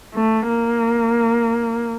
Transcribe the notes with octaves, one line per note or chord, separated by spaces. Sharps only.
A3
A#3